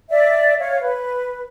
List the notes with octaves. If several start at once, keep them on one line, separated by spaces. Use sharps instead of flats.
D5 E5
C#5 F5
B4